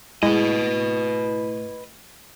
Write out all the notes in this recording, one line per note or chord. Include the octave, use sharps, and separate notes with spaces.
A2 G#3 E4 B4 D#5